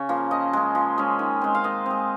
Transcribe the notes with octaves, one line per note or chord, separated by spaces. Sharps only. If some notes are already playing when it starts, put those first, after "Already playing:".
Already playing: C#3 C#5
F3 A#3
F3 D#5
G#3 C#4
F3
G#3 C#4
D#3
G#3 C4
F5
D#3 D#5
G#3 C4